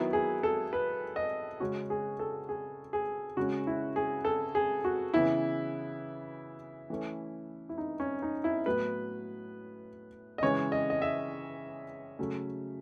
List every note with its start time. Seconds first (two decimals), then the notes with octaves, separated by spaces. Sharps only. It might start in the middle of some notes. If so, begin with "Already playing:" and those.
Already playing: D#3 F#3 B3 E4
0.13 G#4
0.43 A4
0.73 B4
1.16 D#5
1.60 C#3 G#3 C#4 F#4
1.90 G#4
2.19 A4
2.49 G#4
2.93 G#4
3.37 C#3 G#3 C#4 F#4
3.67 E4
3.96 G#4
4.25 A4
4.55 G#4
4.84 F#4
5.14 C#3 E3 B3 E4
6.90 E3 A3 C#4
7.69 E4
7.78 D#4
8.00 C#4
8.22 D#4
8.44 E4
8.66 A2 F#3 B3 B4
10.38 D#5
10.42 C#3 E3 G#3 C#4 C#5
10.72 D#5
10.90 D#5
11.02 E5
12.19 C#3 F#3 A3 C#4